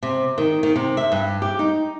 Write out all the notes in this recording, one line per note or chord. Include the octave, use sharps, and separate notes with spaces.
C3
D#3
D#3
C3
E5
G2
G4
D#4